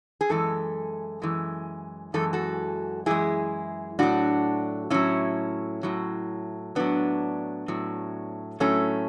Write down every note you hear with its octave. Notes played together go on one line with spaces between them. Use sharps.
G#4
F#2 E3 G#3 A4
F#2 E3 G#3
F#2 E3 G#3 A4
F#4 A4
F#2 E3 G#3 E4 G#4
A2 F#3 D4 F#4
A2 F#3 C#4 E4
A2 F#3
A2 F#3 B3 D4
A2 F#3
A2 F#3 A3 C#4